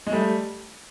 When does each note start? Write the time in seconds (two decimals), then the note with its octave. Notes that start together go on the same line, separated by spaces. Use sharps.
0.07 G#3
0.12 G3 A3